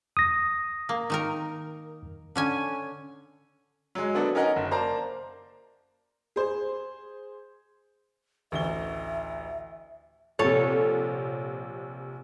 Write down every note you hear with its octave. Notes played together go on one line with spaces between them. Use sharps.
D#6 A#6
A#3
D#3 D#4 A#4
D3 C#4 G#5
F#3 G#3
A#3 B3 D4 F#4 A4
C#4 D#4 A#4 D#5 F#5
F#1
A#3 C5 D5 A5 A#5
G#4 C5
A1 D2 E5 G7
A#1 C3 A4 C#5